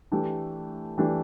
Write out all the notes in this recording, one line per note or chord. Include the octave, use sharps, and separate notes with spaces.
E3 A3 D4 G4
E3 A3 D4 G4